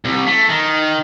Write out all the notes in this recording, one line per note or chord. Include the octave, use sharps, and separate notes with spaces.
C2
A3
D#3